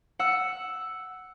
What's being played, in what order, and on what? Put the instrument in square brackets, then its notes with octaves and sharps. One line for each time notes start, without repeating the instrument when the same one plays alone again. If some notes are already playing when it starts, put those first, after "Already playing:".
[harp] F#5 E6